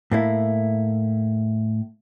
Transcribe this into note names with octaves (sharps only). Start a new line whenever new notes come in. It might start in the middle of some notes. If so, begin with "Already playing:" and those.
A2 A#3 E4